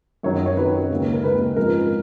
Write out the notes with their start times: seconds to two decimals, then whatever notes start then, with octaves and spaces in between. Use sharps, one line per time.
0.23 F#2 D#3 F#3 C#5
0.35 D#5
0.46 C#5
0.57 F#2 D#3 F#3 B4
0.90 D#2 C#3 G#3
1.13 A#4
1.23 D#2 C#3 G#3 B4
1.56 G#2 F3 G#3 A#4